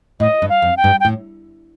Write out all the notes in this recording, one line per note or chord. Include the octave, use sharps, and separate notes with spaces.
A2 D#5
G2
F5
F2
G5
G2
G5
A2